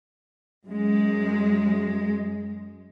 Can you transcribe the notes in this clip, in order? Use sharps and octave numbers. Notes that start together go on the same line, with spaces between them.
F#2 G#3